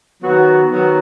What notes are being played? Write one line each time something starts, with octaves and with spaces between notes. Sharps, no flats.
D#3 F#3 B3 F#4
D#3 F#3 B3 F#4